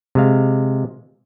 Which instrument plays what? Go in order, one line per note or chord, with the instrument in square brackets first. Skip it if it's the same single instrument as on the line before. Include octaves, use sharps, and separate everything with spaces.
[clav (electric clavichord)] C3 G#3 F5